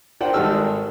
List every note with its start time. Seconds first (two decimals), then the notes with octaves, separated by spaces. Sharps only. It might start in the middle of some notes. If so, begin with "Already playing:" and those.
0.20 D4 F4 A#4 C5 F#5 G5
0.33 G#1 D#3 G3 A4 E6 F6